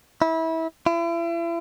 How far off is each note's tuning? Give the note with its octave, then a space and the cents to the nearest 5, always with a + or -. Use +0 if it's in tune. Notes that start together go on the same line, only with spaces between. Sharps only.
E4 -25
E4 +40